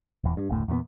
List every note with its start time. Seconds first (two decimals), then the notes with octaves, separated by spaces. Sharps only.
0.24 D#1 E2
0.37 G2
0.49 F#1 D2 A2
0.68 E2 A#2 D3 B3